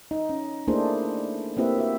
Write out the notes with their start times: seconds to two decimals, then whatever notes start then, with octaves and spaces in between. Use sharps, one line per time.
0.11 D#4
0.29 C#4
0.67 A3 A#3 D4 E4 G#4 C5
1.57 A#3 C4 E4 G4 B4 E5
1.77 F#4 E5